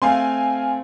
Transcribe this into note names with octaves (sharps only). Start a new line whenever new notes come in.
A3 C4 F5 G#5 C6